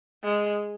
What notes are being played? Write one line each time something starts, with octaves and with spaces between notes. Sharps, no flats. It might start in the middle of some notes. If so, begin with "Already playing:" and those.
G#3